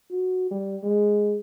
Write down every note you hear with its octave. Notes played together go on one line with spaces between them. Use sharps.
F#4
G3
G#3